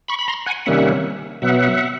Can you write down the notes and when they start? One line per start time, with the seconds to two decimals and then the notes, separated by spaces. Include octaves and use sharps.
0.08 B5 C#6
0.19 B5
0.28 A#5 C6
0.46 F#5 G#5
0.66 C3 D#3 G3 A#3 C#4 E5 F#5
1.42 B2 F#3 B3 E5 F#5